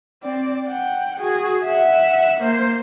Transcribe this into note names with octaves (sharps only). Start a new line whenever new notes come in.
C4 D5
F#5 G5
F#4 G#4
E5 F#5
A#3 C5